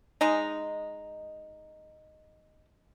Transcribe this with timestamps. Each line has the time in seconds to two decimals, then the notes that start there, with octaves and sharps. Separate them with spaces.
0.21 G#3 D#4